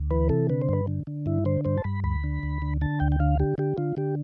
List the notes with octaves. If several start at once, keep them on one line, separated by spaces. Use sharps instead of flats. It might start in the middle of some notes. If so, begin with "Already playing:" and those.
Already playing: D2
E3 B4
C3 A4
D3 B4
C5
G2 B4
D3
D3
G2 E4
D3 C5
G2 C5
A5
G2 B5
D2 B5
D3
D2
D3
D3 A5
D2 G5
G5
D3 F5
D3 G4
D3 G4
D3 F4
D3 G4